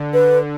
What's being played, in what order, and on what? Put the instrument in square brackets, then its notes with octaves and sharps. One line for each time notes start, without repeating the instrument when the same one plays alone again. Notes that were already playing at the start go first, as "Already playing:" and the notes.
Already playing: [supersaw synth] D3
[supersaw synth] D3 [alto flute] B4